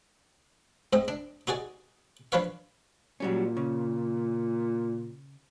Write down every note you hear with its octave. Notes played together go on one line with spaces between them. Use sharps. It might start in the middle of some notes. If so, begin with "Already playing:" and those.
G#2 C4 D#5
D4
D#4 F#4 G#4 D5
F3 D4 B4 C#5 F5
A#2 F#3 G3 C#4
C#3